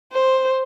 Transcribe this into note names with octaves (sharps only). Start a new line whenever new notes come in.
C5